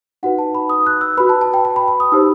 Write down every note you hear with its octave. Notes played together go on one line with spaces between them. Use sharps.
D#4 F#4 B4 F#5
A5
B5
D#6
F#6
E6
F#4 B4 B5
A5
A5
G5
A5
B5
B5
D#6
D#4 G4 C5 E6